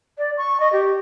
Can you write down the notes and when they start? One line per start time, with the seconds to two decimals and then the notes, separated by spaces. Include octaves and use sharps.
0.18 D5
0.37 C#6
0.60 D#5
0.73 G4